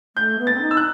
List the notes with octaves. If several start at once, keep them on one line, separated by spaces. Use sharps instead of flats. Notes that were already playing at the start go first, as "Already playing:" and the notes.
A3 G6
B3
A6
C4
D#4
E6
F#6